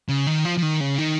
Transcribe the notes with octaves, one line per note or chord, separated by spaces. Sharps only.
C#3
D#3
F3
F3
D#3
C#3
D#3